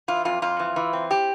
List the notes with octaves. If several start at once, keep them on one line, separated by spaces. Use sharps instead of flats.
E3 F4
F2 F4
F2 F4
E3
E3
C4
G4